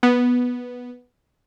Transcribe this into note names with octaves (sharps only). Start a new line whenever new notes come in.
B3